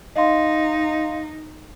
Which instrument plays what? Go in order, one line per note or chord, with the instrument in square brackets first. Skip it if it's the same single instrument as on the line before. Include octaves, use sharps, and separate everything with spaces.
[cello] D#4 [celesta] D#5 F5 C6